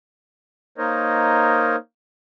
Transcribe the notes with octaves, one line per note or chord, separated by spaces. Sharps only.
A#3 D#4 A#4 C5 C#5 D#5